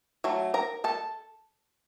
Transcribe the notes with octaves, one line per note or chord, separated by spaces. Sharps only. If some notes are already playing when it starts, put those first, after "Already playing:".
F#3 A3
A#4 A#5
A4 A5